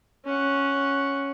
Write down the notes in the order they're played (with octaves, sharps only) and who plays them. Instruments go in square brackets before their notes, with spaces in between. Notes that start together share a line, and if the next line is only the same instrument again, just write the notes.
[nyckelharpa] C#4 F#5